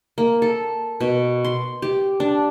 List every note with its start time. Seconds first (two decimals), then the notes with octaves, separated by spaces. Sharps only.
0.18 A#3
0.42 A4
1.01 B2
1.44 C6
1.82 G4
2.20 D4